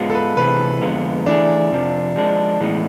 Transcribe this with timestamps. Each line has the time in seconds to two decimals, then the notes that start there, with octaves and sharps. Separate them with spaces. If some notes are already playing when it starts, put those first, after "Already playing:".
Already playing: G#2 G#3 B3 F4
0.10 A4
0.15 B4
0.37 C3 E3 A3 C4 G#4 B4
0.81 F2 D3 G#3 B3 F4
1.26 E3 A3 D4 E4 G#4
1.71 F2 C3 F3
2.16 F3 G#3 D4
2.61 A2 E3 G#3 B3